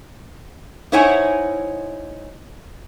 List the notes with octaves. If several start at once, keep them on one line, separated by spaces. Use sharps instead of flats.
D#4 E4 C5 C#5 F#5 G#5